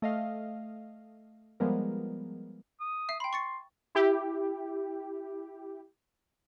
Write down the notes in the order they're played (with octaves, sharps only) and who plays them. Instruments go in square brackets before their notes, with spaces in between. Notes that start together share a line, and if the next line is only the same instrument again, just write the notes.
[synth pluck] A3 D#5 F5
F3 G3 G#3 B3 A#4
[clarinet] D#6
[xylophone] E5 C7
[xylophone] G5 B5 [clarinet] C6
[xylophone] C#6 A6 C#7
[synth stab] E4 G4